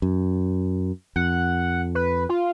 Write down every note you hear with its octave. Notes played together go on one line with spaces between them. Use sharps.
F#2
F2 F#5
B4
F4